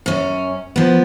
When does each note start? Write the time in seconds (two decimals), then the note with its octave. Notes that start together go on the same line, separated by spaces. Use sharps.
0.06 F#2 C#4
0.76 F3 B3